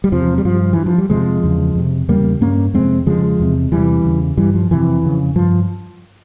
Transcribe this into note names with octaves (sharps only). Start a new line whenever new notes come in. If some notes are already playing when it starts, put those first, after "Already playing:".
G3
E2 C3 F3
G3
G2 F3
G2 E3
F3
G3
F2 C3 F3 G#3
E2 C#3
F2 C3
E2 C#3 G3 A#3
G2 A#3 C#4
F2 C3 G#3 C4
F2 C#3 F3 G#3
E2 C3
E2 C3 E3 G3
E2 C#3
G2 E3 G3
F3
F2 C3 E3
F2 C#3
G2 F3